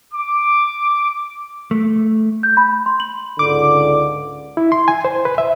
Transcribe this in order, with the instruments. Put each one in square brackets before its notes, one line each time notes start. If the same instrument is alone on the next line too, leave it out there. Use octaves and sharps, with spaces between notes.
[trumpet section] D6
[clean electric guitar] A3
[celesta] G6
B5
C6
F#7
[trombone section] C#2 G#2 D3 [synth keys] D6
[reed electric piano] E4
C6
G#5
C5
B4
E5